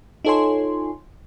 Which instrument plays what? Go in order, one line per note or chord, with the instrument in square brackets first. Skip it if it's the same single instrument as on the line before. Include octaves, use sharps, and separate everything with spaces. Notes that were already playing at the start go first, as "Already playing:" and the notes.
[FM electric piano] D#4 F4 A4 C#5 G#5 C6